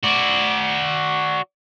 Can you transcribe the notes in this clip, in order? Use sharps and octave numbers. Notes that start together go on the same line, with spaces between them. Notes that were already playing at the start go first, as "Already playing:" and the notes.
F#4 D5